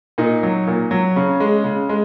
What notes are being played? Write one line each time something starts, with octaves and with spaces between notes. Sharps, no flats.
A#2 D#4
F#3
A#2
F#3
C#3 C#4
G#3
C#3
G#3